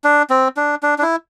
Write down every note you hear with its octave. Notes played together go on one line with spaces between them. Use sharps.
D4
C4
D4
D4
D4
E4